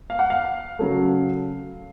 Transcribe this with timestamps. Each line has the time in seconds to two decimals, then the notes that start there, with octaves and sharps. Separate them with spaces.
0.10 F5
0.19 F#5
0.30 F5
0.79 C#3 F#3 A3